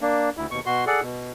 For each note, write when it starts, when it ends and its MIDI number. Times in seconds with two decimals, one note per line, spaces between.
0.01 0.30 58
0.01 0.30 62
0.37 0.46 38
0.37 0.46 64
0.51 0.60 39
0.51 0.60 47
0.51 0.60 85
0.66 0.85 47
0.66 0.85 66
0.66 0.85 84
0.87 1.01 68
0.87 1.01 69
0.87 1.01 74
0.87 1.01 78
1.02 1.32 47